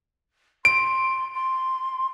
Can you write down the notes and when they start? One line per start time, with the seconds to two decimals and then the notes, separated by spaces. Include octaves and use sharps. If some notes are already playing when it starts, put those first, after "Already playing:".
0.65 C6 D7
1.35 C6